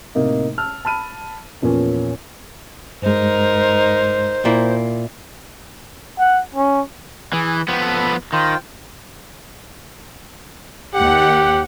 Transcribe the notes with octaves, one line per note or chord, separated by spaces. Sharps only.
A2 C3 A#3 D#4
A5 E6 F6
A5 B5 F6 D#7
E2 A#2 F3 A#3 C#4
G2 G#3 D#4 A#4 C5
A#2 A#3 E4
F#5
C#4
E3 G#4
F3 B3 G5 C#6
A4 B5
D#3 F4 C5 G5
D#2 G4 F#5